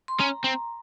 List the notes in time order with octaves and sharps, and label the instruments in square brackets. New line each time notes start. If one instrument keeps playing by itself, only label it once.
[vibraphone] C6
[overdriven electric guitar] C#4 [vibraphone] A#5
[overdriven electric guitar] C4